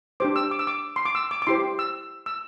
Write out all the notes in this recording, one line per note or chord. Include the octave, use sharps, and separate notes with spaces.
D4 G4 C5 D6
E6
D6
E6
D6
C6
D6
E6
D6
D6
E4 G4 C5 C6
E6
E6